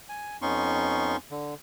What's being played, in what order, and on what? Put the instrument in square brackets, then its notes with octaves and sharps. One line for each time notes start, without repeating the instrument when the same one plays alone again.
[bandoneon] G#5
F2 B3 C#4 D#4 C6 C#6
D3